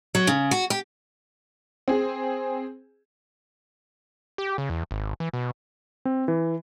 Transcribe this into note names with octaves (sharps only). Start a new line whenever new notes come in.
F#3
C#3
F#4
G4
C4 G#4
G4
C#3
E2
G#1
E3
B2
C4
E3